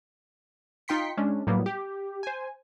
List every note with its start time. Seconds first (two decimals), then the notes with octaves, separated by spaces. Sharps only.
0.88 D#4 F4 G5 C6 B6 C#7
1.17 G#3 C#4 D4
1.47 A2 F#3 G3 A#3 B3
1.66 G4
2.23 C5 G#5